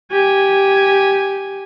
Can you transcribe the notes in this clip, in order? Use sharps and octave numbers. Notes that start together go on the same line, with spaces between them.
G4 G#5